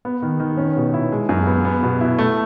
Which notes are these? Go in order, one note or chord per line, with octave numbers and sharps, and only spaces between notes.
B3
D#3
D#3
C#4
B2
E4
G#3
F#2
B3
B3
B2
E4
A3